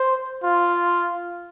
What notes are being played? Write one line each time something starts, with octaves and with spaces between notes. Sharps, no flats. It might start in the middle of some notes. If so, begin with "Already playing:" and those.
Already playing: C5
F4